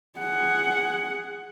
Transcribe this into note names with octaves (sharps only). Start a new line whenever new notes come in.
G#4 F#5